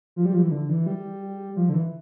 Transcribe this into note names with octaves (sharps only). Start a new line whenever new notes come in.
F3
G3
F3
E3
D3
E3
G3
F3
D3
E3